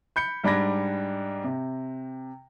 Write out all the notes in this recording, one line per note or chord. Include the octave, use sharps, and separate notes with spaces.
B5 G6 C#7
G#2 G3 D4 B5 G#6 A#6
C3